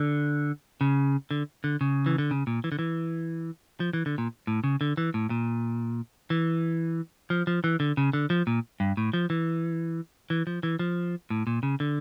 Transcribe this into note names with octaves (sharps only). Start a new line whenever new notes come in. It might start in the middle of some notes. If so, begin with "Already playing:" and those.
Already playing: D3
C#3
D3
D3
C#3
E3
D3
C#3
A#2
E3
D3
E3
F3
E3
D3
A#2
A2
C#3
D3
E3
A2
A#2
E3
F3
F3
E3
D3
C#3
D3
F3
A#2
G2
A2
F3
E3
E3
F3
E3
F3
A2
A#2
C#3
D3